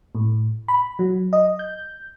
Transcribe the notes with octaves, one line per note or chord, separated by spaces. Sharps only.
A2
B5
F#3
D#5
G6